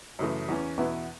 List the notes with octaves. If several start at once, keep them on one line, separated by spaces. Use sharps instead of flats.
F#2 C#3 E3 A3
E2 E3 C#4
E2 B2 B3 E4